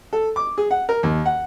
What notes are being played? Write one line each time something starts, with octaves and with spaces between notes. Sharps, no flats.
A4
D6
G#4
F#5
A#4
D#2
F#5